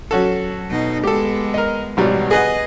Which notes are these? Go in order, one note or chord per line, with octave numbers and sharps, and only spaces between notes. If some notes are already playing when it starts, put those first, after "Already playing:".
F#3 C#4 F#4 A4
B2 D#4
G#3 B3 G4 A4
A#4 D#5
G#1 B2 F#3 G3
G#4 B4 D#5 F#5